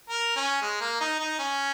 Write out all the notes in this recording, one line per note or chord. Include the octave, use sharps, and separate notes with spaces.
A#4
C#4
G#3
A#3
D#4
D#4
C#4